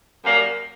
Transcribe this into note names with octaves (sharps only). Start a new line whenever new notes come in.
F#2 G3 A#3